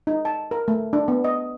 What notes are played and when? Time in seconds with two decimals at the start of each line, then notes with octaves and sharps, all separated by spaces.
0.07 D#4
0.25 A5
0.51 A#4
0.68 A3
0.93 D4
1.08 B3
1.24 D#5